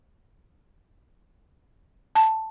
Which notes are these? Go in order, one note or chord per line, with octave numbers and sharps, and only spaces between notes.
A5